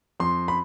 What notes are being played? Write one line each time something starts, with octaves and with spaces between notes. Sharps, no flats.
F2 C6
B5